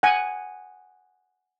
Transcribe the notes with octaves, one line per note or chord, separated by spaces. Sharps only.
F#5 G#5